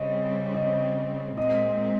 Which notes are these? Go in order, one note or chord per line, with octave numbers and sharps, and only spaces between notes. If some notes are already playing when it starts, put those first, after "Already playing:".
Already playing: C#3 G3 C4 D#5
D#5
A#2 G#3 C4 D#5